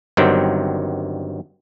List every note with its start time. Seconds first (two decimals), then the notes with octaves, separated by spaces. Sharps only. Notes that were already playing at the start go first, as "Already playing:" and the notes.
0.17 G1 G2 D#3 F#3 C4 G5